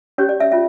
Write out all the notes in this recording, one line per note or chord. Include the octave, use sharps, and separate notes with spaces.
C#4 G4 C#5
D5
E5
C#4 F4 E5